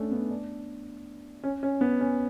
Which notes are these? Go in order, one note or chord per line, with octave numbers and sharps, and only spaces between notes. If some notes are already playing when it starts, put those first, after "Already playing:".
Already playing: A3 C#4 D4
B3
D4
C#4
C#4
B3
C#4